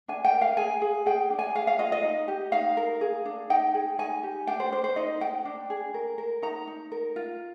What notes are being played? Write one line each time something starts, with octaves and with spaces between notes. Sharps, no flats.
D4 G#5
G5
A#4
F5
G#4 G#5
G#4
G#4 G5
D4
G#5
G#4 F5
F5
F4 D#5
D#5
D#4
G4
D#4 F5
A#4
G#4
D4
D#4 G5
G#4
D#4 G#5
G4
D4 G5
C5
D4 C5
C5
D#4 D#5
D#4 G5
D4
G#4
A#4
A#4
D#4 A#5
D#4
A#4
F4